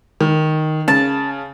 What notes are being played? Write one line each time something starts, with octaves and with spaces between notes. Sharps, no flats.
D#3
C#3 A5